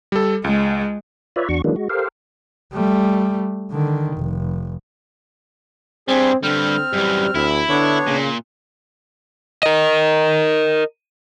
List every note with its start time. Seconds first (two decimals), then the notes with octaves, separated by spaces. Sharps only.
0.12 G3 A4
0.44 C#2 G#3
1.36 F4 B4 C#5 D5 E5
1.49 E2 D4 F#4 C#6
1.64 D#3 E3 F#3 G#3 A#3 D4
1.76 G#3 F#4
1.89 G4 A4 A#4 C5 F5
2.73 G3 A3
3.72 D3 D#3
4.17 F1
6.08 G2 G3 C4 G#4
6.43 G2 D3 G3 C4 F6
6.93 F#2 E3 G3
7.35 D2 E4
7.69 D3 B3 D4 C#5
8.07 A#2 C#3
9.63 A#4 D#5